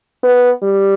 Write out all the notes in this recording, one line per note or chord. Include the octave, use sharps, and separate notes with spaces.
B3
G3